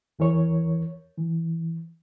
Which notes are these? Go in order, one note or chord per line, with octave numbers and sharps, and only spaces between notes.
E2 E3 A#4 C#5
E3